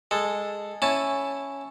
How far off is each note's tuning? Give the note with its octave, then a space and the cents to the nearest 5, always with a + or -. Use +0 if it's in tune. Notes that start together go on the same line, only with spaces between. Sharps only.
G#3 -10 A4 +0
C#4 +0 E4 +0 A5 +5